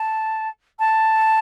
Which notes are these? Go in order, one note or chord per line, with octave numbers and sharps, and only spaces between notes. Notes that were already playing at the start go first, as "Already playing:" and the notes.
Already playing: A5
A5